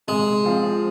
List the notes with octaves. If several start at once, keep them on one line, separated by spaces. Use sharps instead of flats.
C3 G#3
F3 C4 F4